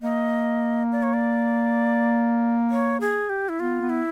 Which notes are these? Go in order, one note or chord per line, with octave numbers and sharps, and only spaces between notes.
A#3 D#5
D5
C#5
D5
C#5
G#4
G4
E4
B3 F4
B3
E4